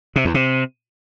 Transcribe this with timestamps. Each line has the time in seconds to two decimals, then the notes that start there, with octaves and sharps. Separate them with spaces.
0.16 C3
0.25 E2
0.34 C3